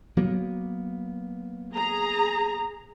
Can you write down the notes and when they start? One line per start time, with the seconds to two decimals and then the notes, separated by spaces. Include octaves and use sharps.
0.17 F#3 A#3 B3
1.73 G#4 A#5